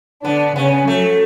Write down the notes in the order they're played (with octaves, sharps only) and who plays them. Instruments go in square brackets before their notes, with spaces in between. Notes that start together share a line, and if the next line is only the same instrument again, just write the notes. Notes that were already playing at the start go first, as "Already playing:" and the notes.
[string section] D3 D4 [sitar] B3
[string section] C#3 C#4 [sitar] B3
[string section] F#3 [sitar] A3